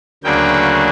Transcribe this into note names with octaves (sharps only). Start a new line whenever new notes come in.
D2 C#3 F#3 A#3 D4 G5